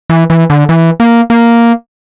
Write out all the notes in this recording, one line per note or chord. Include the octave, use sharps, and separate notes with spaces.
E3
E3
D3
E3
A#3
A#3